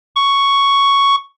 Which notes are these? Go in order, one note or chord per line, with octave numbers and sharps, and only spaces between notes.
C#6